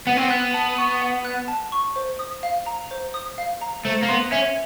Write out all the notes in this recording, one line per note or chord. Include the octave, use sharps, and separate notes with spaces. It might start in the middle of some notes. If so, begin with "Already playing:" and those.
B3 F#5
C4
B3 F#6
A5
C#6
F#5
F#6
A5
C#6
C5
D#6
F5
A#5
C5
D#6
F5
A#5
A3 C5
A#3
B3 C6
C#4 E5